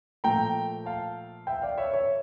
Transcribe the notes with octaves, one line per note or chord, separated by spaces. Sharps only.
A#2 F3 A3 G5 A#5
F5 A5
E5 G5
D5 F5
C#5 E5
C#5 E5